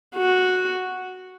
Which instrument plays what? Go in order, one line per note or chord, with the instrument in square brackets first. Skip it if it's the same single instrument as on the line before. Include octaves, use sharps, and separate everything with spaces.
[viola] F#4